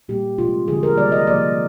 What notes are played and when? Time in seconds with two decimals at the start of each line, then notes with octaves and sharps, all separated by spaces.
0.09 A#2 G3 A#3 G4
0.38 C3 F3 G#3 F4
0.68 D3 F3 G#3 G#4
0.83 A#4
0.97 C3 D#3 G3 A#3 D5
1.12 D#5
1.27 C3 F3 A#3 D5